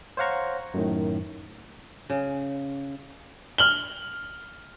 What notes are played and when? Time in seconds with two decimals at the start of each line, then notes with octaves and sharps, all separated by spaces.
0.17 C5 C#5 F5 F#5 A#5 C#6
0.74 F#2 A2 D#3
2.10 C#3
3.58 F6 F#7 G7